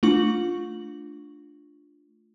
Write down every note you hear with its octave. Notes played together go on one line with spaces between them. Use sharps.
A3 D4 F4 C#6 F#7